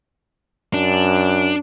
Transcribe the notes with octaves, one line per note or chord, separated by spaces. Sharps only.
F#2 D4